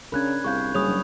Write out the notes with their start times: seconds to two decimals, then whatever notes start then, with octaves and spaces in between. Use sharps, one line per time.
0.12 C#3 C#4 D4 A#4 B5 F#6 G#6
0.44 C2 G#4 F5 C#6 G6
0.75 F#1 G3 G#4 C#5 B5 D#6 F7
0.87 F#3 D4